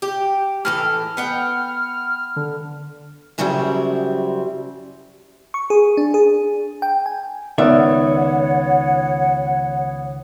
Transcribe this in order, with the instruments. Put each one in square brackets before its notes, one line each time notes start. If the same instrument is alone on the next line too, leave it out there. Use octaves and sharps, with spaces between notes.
[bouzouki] G4
[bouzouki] A2 E3 A4 [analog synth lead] F6
[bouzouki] B3 F#5 G5
[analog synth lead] D3
[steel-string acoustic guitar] F#2 C#3 F#3 G3 C4 E4
[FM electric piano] C#6
G#4
D4
G#4
G5
G#5
[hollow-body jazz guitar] C#2 D#3 E5 [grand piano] B3 D5 [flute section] C#5 F#5